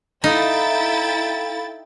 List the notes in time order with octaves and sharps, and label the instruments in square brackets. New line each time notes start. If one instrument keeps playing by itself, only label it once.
[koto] D#4 [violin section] E4 G5 A6 [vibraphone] A4 F5 B5